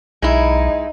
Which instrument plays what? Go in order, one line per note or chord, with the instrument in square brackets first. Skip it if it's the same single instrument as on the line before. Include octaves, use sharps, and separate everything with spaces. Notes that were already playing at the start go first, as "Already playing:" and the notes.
[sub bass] B1 [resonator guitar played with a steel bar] G#3 E4 [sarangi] D#4